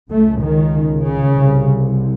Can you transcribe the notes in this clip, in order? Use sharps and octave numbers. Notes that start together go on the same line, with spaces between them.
C#2 C#3 A3
D#3
C#3
C2 C3